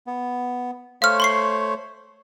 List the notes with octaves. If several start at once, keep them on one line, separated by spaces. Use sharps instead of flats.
B3
A3 C5 C#5 F5 F6
C6 C#6 C7